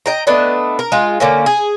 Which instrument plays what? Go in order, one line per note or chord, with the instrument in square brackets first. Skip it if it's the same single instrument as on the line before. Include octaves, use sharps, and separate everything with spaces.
[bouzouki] D#5 G5 A#5
A3 B3 D4 D#5
A#4
G#3 F4
D3 A#3 C#4
G#4